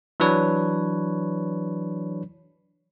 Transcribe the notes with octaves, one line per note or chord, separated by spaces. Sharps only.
E3 F#3 D4 B4 C#5